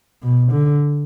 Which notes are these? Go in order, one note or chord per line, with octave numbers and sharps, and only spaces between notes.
B2
D3